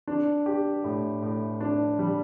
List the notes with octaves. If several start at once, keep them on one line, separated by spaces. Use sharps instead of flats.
D4
G4
A2
A2
D4
G3